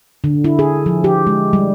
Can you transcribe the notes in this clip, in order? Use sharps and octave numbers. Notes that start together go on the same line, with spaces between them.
D3
E4
G#4
F3
G4
G#3
G3